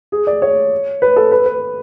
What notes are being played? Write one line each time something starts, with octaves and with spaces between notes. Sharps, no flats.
G#4
D5
C#5
B4
A4
B4
B4